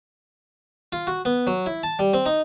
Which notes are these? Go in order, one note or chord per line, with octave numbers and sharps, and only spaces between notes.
F4
F#4
B3
F#3
E4
A5
G3
C4
D#4